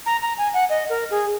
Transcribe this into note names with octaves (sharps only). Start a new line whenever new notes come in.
A#5
A#5
G#5
F#5
D#5
A#4
G#4